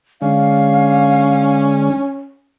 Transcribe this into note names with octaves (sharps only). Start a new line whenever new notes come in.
D3 G#3 C#4 D4 F5